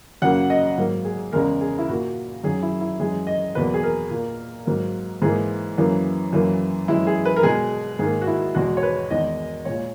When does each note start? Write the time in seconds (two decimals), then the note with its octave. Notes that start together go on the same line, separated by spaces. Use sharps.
0.22 F#2 C#3 F#3 A#3 F#5
0.50 D#5
0.78 G#2 F#3 A#3
1.05 G#4
1.32 E2 C#3 G#3 A#4
1.61 G#4
1.79 E4
1.89 A#2 A#3 F#4
2.44 F#2 D#3 F#3 G#4
2.62 E4
2.81 E4
2.99 F#2 E3 G#3 G#4
3.27 D#5
3.55 E2 B2 F#3 A#3 B4
3.74 G#4
3.83 A#4
4.10 A#2 A#3
4.66 G#2 F#3 A#3
5.22 G#2 E3 A#3 G#4
5.78 F#2 E3 A#3
6.33 F#2 E3 A#3
6.88 F#2 E3 G#3 E4
7.07 G#4
7.25 B4
7.36 A#4
7.43 B2 G#3 G#4
7.99 G#2 D#3 A#3 G#4
8.22 F#4
8.27 E4
8.55 E2 B2 G#3 F#4
8.77 C#5
8.83 B4
9.11 E2 D#3 G#3 D#5
9.65 A#2 G#3 C#5